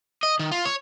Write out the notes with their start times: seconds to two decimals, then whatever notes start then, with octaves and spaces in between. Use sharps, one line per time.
0.23 D#5
0.39 D#3
0.52 F4
0.65 C#5